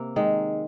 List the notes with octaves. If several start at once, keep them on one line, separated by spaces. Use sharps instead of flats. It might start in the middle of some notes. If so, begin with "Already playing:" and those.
Already playing: C3 A#3
D#3 G#3